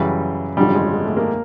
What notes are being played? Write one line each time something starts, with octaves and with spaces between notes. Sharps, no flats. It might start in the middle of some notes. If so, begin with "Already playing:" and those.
Already playing: F#2 C#3 E3 G3
G#1 F#2 D3 F3 G3
G#3
G#3
A3
A#3